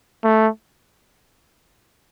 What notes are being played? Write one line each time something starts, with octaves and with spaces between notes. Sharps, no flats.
A3